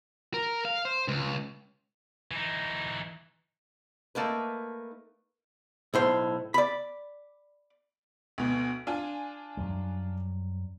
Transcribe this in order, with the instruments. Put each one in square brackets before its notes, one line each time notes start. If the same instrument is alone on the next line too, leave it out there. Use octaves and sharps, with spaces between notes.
[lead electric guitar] A#4
F5
C5
C#2
[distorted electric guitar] E3 D#4
[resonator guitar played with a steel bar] A3 A#3 D#4 B4
[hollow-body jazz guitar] B1 A2 C5
D5 B5
[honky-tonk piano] D2 B2
D4 F4 G#5
[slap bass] F#2 F#3 G3